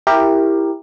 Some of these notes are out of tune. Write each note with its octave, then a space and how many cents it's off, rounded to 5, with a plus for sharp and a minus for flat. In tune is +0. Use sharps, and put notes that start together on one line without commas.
E4 +0 G4 +10 A#4 +0